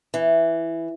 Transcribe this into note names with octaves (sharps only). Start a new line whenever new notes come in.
E3